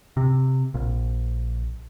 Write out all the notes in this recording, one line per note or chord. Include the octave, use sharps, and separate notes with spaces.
C3
A#1